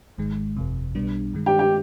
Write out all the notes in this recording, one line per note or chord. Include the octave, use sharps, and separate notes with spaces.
G#1 G#2 D#3 G#3
G1 F2 C3
B1 B2 G3 B3 D4
G2 D#3 G#3
G4
G4